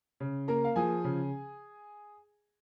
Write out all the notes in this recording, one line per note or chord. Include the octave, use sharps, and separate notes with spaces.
C#3
A#3 A#4 A#5
F5
F3 G#4 G#5
C#3